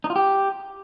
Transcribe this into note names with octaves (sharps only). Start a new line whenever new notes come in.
D#4
F4
G4